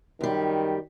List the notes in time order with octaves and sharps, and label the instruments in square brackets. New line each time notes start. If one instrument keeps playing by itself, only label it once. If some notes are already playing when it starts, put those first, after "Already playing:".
[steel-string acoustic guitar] F#2 G3 [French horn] D#3